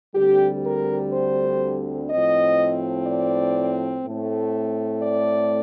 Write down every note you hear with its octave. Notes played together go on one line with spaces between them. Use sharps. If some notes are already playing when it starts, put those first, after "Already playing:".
D2 D3 G3 C4 G4
A#4
C5
A2 F3 C4 D#5
D5
A2 A3 C4
D5